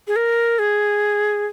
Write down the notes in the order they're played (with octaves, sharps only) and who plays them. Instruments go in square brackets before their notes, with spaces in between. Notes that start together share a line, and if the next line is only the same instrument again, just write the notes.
[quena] G#4
A#4
G#4